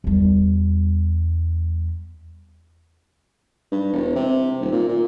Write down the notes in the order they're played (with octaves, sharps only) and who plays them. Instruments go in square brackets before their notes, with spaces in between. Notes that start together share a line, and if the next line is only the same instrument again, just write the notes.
[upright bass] E2 G3
[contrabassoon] G2
E1
C3
D#1
A#2
A#2